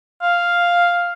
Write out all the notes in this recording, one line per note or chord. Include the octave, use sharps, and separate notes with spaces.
F5